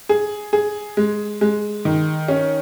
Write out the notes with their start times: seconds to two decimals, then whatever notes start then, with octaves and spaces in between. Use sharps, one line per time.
0.09 G#4
0.53 G#4
0.97 G#3
1.41 G#3
1.85 D#3
2.28 C#4